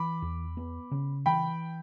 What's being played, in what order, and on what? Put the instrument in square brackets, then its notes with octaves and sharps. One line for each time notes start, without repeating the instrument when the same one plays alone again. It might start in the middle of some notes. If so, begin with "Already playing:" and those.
Already playing: [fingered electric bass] E3 [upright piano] B5 D6
[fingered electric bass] E2
B3
C#3
[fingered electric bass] E3 [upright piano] G5 B5